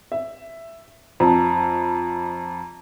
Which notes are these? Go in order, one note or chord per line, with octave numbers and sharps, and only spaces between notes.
E5
F2 A5 A#5